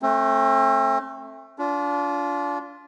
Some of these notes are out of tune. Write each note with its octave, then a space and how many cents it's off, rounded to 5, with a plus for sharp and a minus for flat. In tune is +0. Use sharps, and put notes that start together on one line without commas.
A3 +0 C4 +40
D4 -35 F4 +0